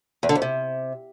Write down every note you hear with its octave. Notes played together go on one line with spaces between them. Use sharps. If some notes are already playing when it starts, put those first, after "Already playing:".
E2
D3
F2
C3